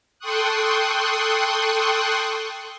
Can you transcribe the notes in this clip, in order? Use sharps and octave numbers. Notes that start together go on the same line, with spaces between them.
A4 G5 C6 C#6 D#6 F#6